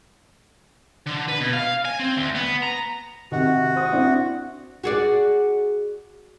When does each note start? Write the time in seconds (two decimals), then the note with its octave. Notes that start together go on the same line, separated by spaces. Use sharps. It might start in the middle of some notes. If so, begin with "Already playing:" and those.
1.07 D3
1.28 B4
1.40 B2
1.53 F5
1.85 G#5
1.99 C4
2.17 D2
2.35 B3
2.63 A#5
3.32 C3 D#3 F#4
3.76 C5 D#6
3.92 C4 D4 E4
4.84 F#4 G#4 D5